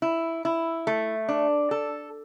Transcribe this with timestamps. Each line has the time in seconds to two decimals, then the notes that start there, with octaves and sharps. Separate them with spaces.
0.02 E4
0.45 E4
0.87 A3
1.28 D4
1.71 A4